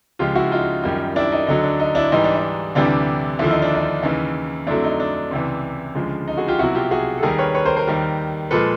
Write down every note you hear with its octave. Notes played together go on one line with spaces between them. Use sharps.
C#2 C#3 F3 G#3 F4 G4
E4 F#4
D#4 F4
F#2 D#3 G3
D4 E4
D#4
D2 D3 F#3 D#4
D4
D#4
D4 E4
G#2 E3 G3 D#4
D4
D#4
D2 C3 E3 G3 D4
D#2 D3 F3 E4
D#4
D4
D#4
D#2 C#3 E3 D#4
F2 D3 F#3 A3 D4 E4
D#4
D4
C#2 C3 E3
D2 C#3 F3 G#3
D#4
F#4 G#4
F4 G4
C2 B2 F#3 E4 F#4
F4 G4
F#4 G#4
A4
D#2 D#3 G3 G#4 A#4
B4 C#5
B4 C#5
A#4 C5
A#4 C5
D#2 D#3 G3
A#2 F3 G#3 A4 B4